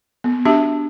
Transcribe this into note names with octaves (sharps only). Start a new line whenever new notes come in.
B3
D4 F#4 G4 E5 A5